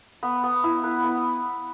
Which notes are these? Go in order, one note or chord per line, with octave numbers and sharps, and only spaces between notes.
B3
B3
E4
B4
B3